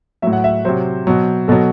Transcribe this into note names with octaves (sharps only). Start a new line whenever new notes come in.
A2 F#3 E5
F#5
E5
C3 F#3 C5
B2 F#3
B2 F#3 A4